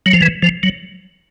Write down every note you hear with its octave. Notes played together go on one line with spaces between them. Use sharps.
F#3
F3
E3
F3
F#3